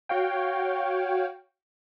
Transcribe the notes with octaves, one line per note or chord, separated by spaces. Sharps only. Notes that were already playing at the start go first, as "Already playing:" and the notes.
F#4 C#5 F5 G5